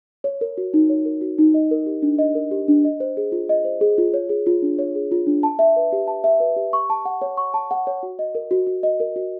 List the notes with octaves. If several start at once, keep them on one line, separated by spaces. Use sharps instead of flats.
C#5
A#4
F#4
D#4
C#5
A#4
F#4
D#4
D#5
A#4
G4
D4
D#5
A#4
G4
D4
D#5
C5
G#4
F4
D#5
C5
G#4
F4
C#5
G#4
F4
D4
C#5
G#4
F4
D4
A5
E5
B4
G4
A5
E5
B4
G4
C#6
A5
F#5
C#5
C#6
A5
F#5
C#5
F#4
D#5
A#4
F#4
F#4
D#5
A#4
F#4